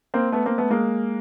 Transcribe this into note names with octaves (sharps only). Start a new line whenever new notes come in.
A#3 C4
A3 B3
A#3 C4
A3 B3
G#3 A#3